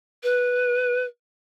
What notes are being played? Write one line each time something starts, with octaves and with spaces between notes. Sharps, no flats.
B4